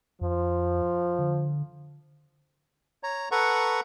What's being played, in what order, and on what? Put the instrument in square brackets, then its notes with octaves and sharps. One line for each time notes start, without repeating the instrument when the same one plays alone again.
[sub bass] F2 [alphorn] F3
[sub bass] D3
[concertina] C#5 A#5
A4 B4 F#5 A#5 C#6